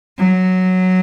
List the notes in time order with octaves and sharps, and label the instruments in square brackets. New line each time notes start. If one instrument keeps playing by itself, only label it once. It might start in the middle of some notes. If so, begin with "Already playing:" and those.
[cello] F#3